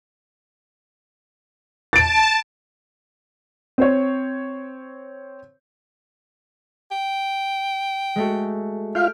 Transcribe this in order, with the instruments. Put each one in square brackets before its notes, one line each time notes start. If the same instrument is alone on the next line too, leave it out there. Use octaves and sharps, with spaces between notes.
[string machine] A5 [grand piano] A6 D7
[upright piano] C4 C5 C#5
[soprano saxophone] G5
[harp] G#3 A3 F#4
[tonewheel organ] F4 F5 [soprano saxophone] E5 [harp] F6 G6 D7